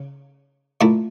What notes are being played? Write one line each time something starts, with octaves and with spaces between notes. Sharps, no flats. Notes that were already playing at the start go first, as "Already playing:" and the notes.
Already playing: C#3
A#2 A3 E4